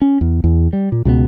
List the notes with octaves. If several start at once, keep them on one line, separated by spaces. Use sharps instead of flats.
C#4
E2
E2
G3
A#2
C#2 B2 F#3 B3